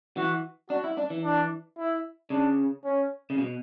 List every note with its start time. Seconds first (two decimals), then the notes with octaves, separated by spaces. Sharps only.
0.17 E3 F#4
0.70 D4 F#4
0.84 E4
0.97 D4
1.10 E3
1.24 D4
1.77 E4
2.30 C#3 D4
2.84 C#4
3.30 C#3
3.38 B2